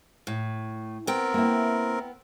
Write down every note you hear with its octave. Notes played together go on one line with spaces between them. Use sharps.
A2
B3 C4 A#4 G5
A#3 E4